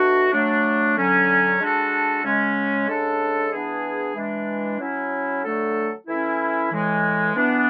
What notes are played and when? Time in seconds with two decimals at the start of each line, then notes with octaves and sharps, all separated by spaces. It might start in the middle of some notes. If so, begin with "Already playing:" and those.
Already playing: B2 A3 D4 F#4
0.32 F#3 A3 D4
0.97 D3 F#3 C#4
1.60 G#3 D4 F#4 A4
2.24 C#3 G#3 C#4
2.88 C#3 G#3 D4 A4
3.52 E3 B3 D4 G#4
4.15 E3 G#3 D4
4.79 F#3 C#4 E4
5.43 D3 F#3 A3 D4 A4
6.07 E3 A3 C#4 E4
6.71 A2 E3 G#3
7.35 E3 B3 D4